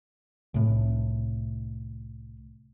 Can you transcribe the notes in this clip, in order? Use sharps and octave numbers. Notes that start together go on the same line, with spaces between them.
C2 A2